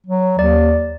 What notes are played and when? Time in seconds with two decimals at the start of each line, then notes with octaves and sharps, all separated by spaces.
0.06 F#3
0.39 D#2 D5